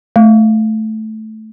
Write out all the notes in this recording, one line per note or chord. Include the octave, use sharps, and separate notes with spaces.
A3